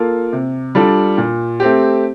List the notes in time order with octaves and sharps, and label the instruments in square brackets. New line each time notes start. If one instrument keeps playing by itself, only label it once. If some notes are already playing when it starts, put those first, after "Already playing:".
Already playing: [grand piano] A#3 F4 A4
C3
G3 D4 F4 A4
A#2
A3 C4 G4